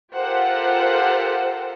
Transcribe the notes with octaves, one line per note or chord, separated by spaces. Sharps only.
F4 G4 A4 A#4 C5 F#5